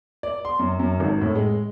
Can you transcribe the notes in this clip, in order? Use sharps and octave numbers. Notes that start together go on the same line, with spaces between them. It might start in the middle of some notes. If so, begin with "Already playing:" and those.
D5
C6
F#2
F#2
G#1
A2
G#3